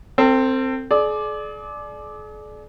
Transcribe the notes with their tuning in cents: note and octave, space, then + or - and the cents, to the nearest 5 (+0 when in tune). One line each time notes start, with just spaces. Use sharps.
C4 +0 A4 +35
G#4 +45 D5 +10